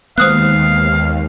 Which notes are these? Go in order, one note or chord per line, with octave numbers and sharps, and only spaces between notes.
D#2 G#3 B3 C5 F5 D#6 F#6